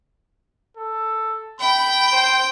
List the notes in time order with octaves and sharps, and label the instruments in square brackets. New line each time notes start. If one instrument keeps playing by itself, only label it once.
[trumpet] A4
[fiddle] G5 [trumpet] B5
[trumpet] C5